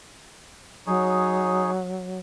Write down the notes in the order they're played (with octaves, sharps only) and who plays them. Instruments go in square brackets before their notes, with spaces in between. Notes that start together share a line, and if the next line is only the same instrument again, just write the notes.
[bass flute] F#3 [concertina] D#4 G#4 C#5